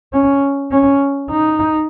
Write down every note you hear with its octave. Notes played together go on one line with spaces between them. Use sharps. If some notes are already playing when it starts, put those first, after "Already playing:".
C#4
C#4
D#4